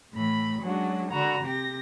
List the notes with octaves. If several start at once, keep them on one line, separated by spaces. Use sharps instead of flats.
A2 E3 B5
F#3 G#3 C#4 D4 F#4
D3 F#4 A#5 B5
C3 G4 A#6